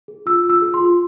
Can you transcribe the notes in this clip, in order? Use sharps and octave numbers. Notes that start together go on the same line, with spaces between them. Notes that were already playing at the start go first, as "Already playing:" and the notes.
G#4
F4 E6
F4
E6
G#4
C6
F4